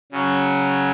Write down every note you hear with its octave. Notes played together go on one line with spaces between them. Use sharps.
C#3 F#3 C#4